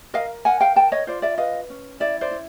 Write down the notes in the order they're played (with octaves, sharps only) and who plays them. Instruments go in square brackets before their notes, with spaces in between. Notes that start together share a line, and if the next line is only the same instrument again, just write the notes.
[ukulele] A#4 D#5 F5
A#4 F#5 G#5
F5 G5
A#4 G5 A5
C#5 D#5
F4 C5 D5
D5 E5
B4 D#5 F5
C#4
E4 D5 E5
C5 D5
E4